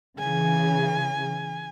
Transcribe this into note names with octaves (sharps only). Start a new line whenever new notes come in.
C#3 E3 G#5